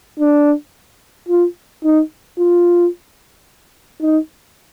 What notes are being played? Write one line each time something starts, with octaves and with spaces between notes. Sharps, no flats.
D4
F4
D#4
F4
D#4